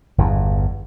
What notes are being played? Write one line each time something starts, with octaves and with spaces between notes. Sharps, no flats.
G1 E2